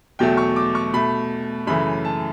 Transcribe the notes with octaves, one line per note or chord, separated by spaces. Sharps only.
E2 B2 F#3 A3 G5
C#6
D6
C#6
B2 A3 B5
F#2 C#3 E3 A3 B5
A5